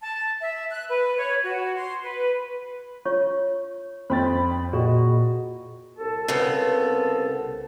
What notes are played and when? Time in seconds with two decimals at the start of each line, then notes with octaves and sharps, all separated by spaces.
0.01 A5
0.40 E5
0.70 F#6
0.89 B4
1.17 C#5
1.43 F#4
1.75 C6
2.04 B4
3.05 F4 C#5 C#6
4.10 F2 C5 G5 B5 C6 A6
4.73 A#2 F#4 G#4 D5 D#5 A#5
5.98 C2 A4 A5
6.28 C#3 B3 C4